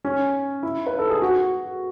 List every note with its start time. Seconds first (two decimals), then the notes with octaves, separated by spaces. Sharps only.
0.05 C#4
0.63 E4
0.87 B4
0.99 A4
1.10 G#4
1.22 F#4